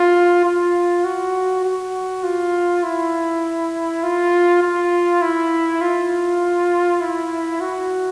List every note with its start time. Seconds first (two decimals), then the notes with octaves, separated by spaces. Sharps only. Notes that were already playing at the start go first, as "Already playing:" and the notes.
Already playing: F4
0.45 F4
1.04 F#4
1.64 F#4
2.24 F4
2.83 E4
4.03 F4
4.63 F4
5.22 E4
5.81 F4
7.01 E4
7.61 F#4